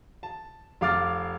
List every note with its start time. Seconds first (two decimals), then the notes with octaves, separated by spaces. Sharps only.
0.23 A5
0.81 F1 F5 D6 F6 A6